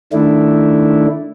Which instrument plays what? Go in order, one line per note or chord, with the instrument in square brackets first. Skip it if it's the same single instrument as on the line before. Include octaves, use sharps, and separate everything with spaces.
[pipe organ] D#3 A3 D4 E4